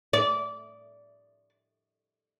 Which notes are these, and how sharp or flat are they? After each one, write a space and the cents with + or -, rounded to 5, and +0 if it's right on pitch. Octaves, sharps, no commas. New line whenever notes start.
D5 -20